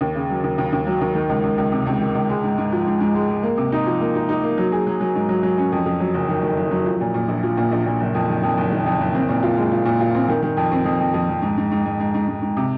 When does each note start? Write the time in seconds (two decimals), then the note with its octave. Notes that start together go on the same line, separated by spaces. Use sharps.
0.01 D#2
0.15 C#3
0.30 F#3
0.44 D#2
0.58 D#2
0.73 D#2
0.87 F#3
1.01 D#2
1.15 D#3
1.29 C#2
1.43 C#2
1.58 C#2
1.72 C3
1.87 C#2
2.01 D#3
2.15 C#2
2.29 G#3
2.44 G#2
2.58 G#2
2.72 F3
2.87 G#2
3.01 G#2
3.15 G#3
3.30 G#3
3.43 A#3
3.57 C3
3.72 D#4
3.87 F3
4.01 A#3
4.15 D#4
4.29 D#4
4.43 A#3
4.58 F#3
4.72 G#4
4.87 F#3
5.01 F#3
5.15 G#2
5.29 F#3
5.43 F#3
5.58 C#4
5.72 F2
5.86 F2
6.00 F#3
6.14 F#1
6.29 D#3
6.43 D#3
6.57 F#1
6.71 F#3
6.86 F3
7.00 A#2
7.14 A#2
7.28 A#1
7.43 F3
7.57 A#2
7.71 A#1
7.86 A#2
8.00 F#1
8.15 F2
8.29 D#3
8.43 F2
8.58 F#1
8.71 D#3
8.86 F2
9.00 F#1
9.15 C4
9.29 A#2
9.43 F4
9.57 G#3
9.72 F4
9.86 A#2
10.00 F4
10.15 C4
10.28 D#3
10.43 D#3
10.57 F2
10.72 C4
10.85 F2
11.00 F2
11.14 F2
11.29 F2
11.42 G#2
11.57 G#2
11.71 G#2
11.86 G#2
12.00 G#2
12.14 G#2
12.28 G#2
12.42 G#2
12.57 C3